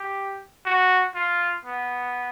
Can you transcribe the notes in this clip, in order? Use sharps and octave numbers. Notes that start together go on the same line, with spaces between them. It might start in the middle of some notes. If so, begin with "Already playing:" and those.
Already playing: G4
F#4
F4
B3